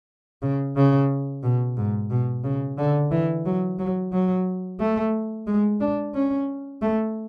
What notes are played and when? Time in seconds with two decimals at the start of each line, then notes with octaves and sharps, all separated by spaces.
0.42 C#3
0.76 C#3
1.43 B2
1.77 G#2
2.10 B2
2.44 C#3
2.78 D3
3.11 E3
3.45 F#3
3.79 F#3
4.12 F#3
4.80 A3
5.47 G#3
5.80 D4
6.14 C#4
6.82 A3